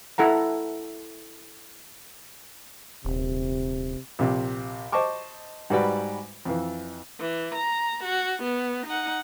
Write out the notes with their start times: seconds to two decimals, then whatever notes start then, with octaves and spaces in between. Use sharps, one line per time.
0.18 E4 A4 F#5 A#5
3.05 D#1 C3
4.19 A#1 C3
4.92 C5 D#5 A5 C#6 D6
5.70 G#2 G3 F#4 B4 D5 B5
6.45 F2 E3
7.20 E3
7.55 A#5
8.04 F#4
8.43 B3
8.86 D#4 F#5